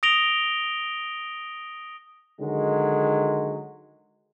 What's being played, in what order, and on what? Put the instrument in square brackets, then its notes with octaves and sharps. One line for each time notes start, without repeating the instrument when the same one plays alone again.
[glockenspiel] D#6 A#6 D7 F7 G7
[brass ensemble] D3 D#3 F#3 G#3